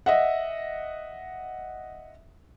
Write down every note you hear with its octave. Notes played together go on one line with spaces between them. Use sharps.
D#5 E5 F#5